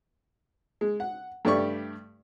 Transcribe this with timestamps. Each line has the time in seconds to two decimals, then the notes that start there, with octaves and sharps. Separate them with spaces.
0.81 G#3
1.00 F#5
1.45 G2 A3 G4 D5 C#6